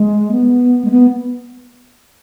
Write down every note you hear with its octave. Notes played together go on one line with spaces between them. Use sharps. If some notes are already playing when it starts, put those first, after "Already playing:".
Already playing: G#3
B3
G#3
B3